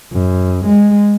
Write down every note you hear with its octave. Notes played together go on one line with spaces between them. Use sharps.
F#2
G#3